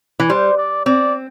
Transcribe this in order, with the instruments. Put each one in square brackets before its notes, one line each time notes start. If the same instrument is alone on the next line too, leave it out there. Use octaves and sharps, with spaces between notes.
[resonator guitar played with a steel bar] E3
[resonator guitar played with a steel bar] G3 [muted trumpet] C5
[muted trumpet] D5
[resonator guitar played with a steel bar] C4 [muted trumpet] D5